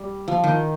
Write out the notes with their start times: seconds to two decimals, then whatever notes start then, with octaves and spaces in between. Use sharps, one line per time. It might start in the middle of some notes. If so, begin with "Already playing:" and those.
Already playing: G3
0.28 F3
0.44 D#3